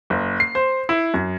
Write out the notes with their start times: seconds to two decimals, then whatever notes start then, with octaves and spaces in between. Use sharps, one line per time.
0.10 F#1
0.40 C7
0.55 C5
0.89 E4
1.14 F#2